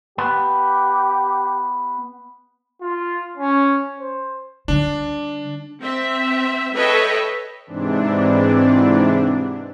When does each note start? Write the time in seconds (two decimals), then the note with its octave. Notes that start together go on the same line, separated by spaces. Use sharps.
0.18 B3 G4
2.81 F4
3.37 C#4
3.99 C5
4.68 D3 G3 D4
5.81 C4 E5
6.74 A4 B4 C#5 D#5 E5 G5
7.67 G#2 C3 E3 D4